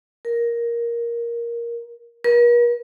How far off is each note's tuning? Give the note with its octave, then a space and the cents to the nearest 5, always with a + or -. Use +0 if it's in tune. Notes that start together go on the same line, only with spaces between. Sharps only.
A#4 +10
A#4 +45